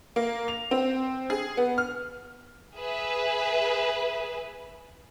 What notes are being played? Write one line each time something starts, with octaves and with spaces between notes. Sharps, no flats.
A#3
F7
C4
G#4
B3
F6
G#4 B4 E5